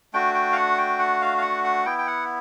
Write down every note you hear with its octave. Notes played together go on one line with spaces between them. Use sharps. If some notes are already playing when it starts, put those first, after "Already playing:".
A3 D4 F#4 G5
G5
F5
F#5
G5
F#5
F5
F5
F#5
F#5
B3 E4 G5
G5
F#5